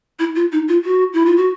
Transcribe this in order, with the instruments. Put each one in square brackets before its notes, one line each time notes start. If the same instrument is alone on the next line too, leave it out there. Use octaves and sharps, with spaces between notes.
[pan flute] E4
F4
D#4
F4
F#4
E4
F4
F#4